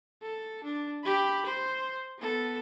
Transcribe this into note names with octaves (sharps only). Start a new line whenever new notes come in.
A4
D4
G4 B5
C5
B3 A4